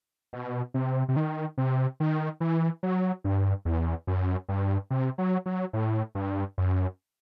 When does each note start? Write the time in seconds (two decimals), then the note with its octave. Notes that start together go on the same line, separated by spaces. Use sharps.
0.33 B2
0.74 C3
1.09 C3
1.16 D#3
1.58 C3
2.00 D#3
2.40 E3
2.83 F#3
3.24 G2
3.65 E2
4.07 F#2
4.49 G2
4.90 C3
5.18 F#3
5.46 F#3
5.73 A2
6.15 G2
6.58 F#2